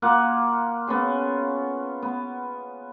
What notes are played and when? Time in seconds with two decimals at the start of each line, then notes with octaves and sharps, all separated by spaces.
0.02 A#3 F4 F5 F#5
0.87 B3 C#4 G#4
2.02 B3